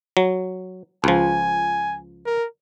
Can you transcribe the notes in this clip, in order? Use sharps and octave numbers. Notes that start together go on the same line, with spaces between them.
F#3
C#2 F3 G#5
A#4